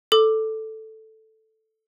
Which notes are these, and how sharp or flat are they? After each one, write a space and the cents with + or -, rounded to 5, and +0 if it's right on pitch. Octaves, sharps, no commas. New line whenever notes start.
A4 +0 D6 +10